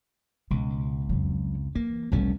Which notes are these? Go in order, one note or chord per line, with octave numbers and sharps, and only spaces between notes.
C#2 B2
F2 F#3
E3 A#3
F1 B1 G3 A3 C#4